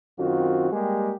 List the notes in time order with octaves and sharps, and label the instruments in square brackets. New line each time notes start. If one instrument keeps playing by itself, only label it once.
[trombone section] F#2 D#3 C4 F4 F#4
G3 G#3 A#3 G4